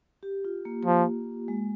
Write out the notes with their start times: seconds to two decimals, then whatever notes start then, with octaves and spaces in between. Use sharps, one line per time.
0.23 G4
0.45 F4
0.65 A#3
0.85 F3
1.48 G#3